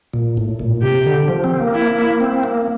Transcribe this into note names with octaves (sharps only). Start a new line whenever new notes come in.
A#2
A2
A#2
C3 G4
D3
F3
C4
A#3
E4
C4
A#3